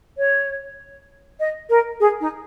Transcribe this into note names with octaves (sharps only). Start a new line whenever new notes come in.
C#5
D#5
A#4
G#4
D#4